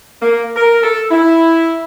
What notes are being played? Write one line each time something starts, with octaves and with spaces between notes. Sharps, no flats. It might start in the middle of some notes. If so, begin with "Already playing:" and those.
A#3
A#4
A4
E4